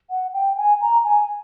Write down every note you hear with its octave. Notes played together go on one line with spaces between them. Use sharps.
F#5
G5
G#5
A#5
G#5